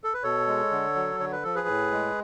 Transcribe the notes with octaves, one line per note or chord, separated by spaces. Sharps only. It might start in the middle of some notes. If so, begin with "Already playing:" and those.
A4
B4
B2 A4 C#5
G#3
D3
F#3
D3 C#5
B4
F3 A4
G#4 B4
A2
G#3